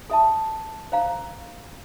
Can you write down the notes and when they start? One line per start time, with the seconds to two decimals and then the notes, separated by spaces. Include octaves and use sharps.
0.10 A4 E5 A5
0.92 C5 F5 A#5